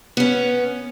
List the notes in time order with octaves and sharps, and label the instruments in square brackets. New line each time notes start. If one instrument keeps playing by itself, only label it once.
[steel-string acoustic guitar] B3 C#4